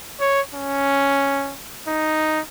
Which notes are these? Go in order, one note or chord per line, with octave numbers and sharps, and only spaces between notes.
C#5
C#4
D#4